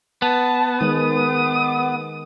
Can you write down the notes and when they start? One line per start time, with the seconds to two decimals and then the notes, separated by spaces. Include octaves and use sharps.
0.22 B3 A5
0.81 D#3 G#3 D#6